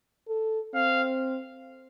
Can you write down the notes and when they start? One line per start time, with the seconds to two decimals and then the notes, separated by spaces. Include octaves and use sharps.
0.28 A4
0.74 C4 F5